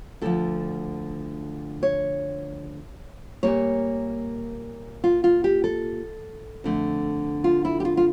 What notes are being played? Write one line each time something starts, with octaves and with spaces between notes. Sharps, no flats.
D2 D3 F3 A4
C#5
A#2 G3 A#3 C#5
F4
F4
G4
A4
F2 D3 A3
F4
E4
G4
F4
F4